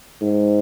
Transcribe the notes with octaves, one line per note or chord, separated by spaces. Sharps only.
G#2